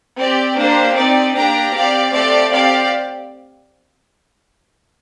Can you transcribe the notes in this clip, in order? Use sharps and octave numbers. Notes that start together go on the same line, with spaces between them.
C4 G4 D5
A#3 D4 G4 C5
C4 D#4 G4 D5
A#3 D4 G4 G5 A#5
C4 G4 D5 F5
A3 C4 G4 D5 F5
C4 G4 D5 F5